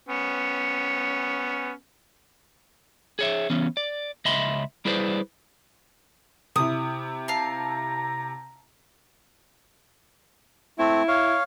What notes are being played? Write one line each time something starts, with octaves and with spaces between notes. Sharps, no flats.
B3 C#4
G#4 C#5 E5
E3 B3 C#4
D5
C#2 D#5 E5 B5 C6
G3 E4 G#4 B4 C5 D5
C3 E4 D#6
F5 A5 A#5
A3 C4 E4
C#5 F5